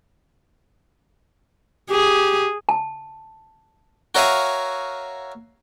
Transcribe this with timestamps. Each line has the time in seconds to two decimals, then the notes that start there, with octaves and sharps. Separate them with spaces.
1.90 G4 G#4
2.69 A5
4.15 F#4 A#4 C#5 E5 F5 G#5